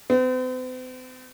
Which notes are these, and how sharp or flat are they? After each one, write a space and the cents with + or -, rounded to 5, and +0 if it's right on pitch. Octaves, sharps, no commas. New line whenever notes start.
C4 -45